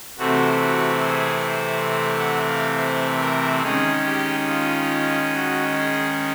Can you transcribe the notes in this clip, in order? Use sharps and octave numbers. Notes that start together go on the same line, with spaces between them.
C3 E3 A3 C4 F#4
F#4
G#4
C5
C5
F#5
F5
C5
A#4
D#3 G#3 C#4 G#4
G4
F4
F#4
G#4